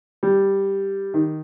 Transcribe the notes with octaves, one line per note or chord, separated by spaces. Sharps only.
G3
D#3